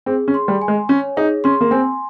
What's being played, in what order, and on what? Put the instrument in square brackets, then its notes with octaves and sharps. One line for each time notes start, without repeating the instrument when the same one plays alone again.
[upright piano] C4 [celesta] G#4
[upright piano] C#4
[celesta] C6
[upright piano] G3
[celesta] G#5
[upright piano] G#3
[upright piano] C#4 [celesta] C#5
[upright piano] D#4 [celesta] G#4
[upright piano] C#4 [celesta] C6
[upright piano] A#3
[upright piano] C4 [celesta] G#5